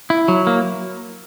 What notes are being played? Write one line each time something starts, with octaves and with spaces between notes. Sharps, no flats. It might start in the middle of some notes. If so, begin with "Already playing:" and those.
E4
F#3
A#3